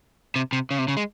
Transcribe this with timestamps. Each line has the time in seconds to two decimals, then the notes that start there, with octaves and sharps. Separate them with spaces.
0.36 C3
0.53 C3
0.71 C#3
0.79 C3
0.88 C#3
0.97 G#3